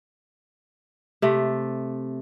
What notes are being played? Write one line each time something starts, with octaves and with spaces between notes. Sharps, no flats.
C3 A3